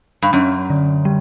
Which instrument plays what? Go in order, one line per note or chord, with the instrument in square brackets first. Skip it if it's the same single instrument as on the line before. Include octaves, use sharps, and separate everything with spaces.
[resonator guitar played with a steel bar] G2
[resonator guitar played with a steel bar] F#2 [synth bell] C#4
[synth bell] D3
G3